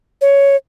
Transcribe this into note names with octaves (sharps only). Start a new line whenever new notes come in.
C#5